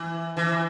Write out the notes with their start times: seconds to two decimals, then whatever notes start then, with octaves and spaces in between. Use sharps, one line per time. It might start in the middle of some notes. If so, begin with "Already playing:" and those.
Already playing: E3
0.37 E3